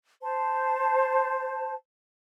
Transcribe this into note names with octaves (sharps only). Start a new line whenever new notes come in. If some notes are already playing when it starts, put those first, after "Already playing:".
C5 A5